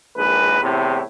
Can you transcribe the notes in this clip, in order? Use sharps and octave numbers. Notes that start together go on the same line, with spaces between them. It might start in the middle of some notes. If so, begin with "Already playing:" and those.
A#1 D#2 G#3 B4
E2 A2 C3